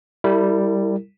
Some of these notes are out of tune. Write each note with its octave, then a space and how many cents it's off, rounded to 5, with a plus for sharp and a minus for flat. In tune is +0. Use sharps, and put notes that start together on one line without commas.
G3 +0 E4 +0 A#4 -40